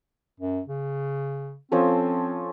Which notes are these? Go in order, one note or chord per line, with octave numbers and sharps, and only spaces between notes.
F#2
C#3
F3 C4 C#4 A4